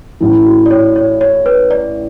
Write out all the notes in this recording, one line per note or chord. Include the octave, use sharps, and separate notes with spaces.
A1 A2 E3 E4
F#4
D5
C#5
C#5
C#5
B4
D5